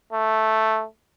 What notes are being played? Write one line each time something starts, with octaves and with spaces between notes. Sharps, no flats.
A3